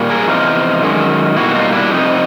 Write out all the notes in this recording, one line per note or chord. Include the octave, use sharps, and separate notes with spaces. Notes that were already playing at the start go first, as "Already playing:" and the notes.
Already playing: A#2 G3 A#3
G#4 A#4
E2 C3 F3 D#4 F4
F#2 D#3 G#3
B2 G3 A#3 E4 F#4
D#4 F4
D4 E4
F2 C3 F3 D#4